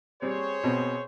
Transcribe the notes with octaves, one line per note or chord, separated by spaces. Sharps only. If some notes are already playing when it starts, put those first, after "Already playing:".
G3 C4 G#4 C5 C#5
B2 C4